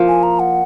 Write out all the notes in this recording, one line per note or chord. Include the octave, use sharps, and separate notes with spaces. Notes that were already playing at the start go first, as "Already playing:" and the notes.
Already playing: F3 A#3
G#5
A#5
F#5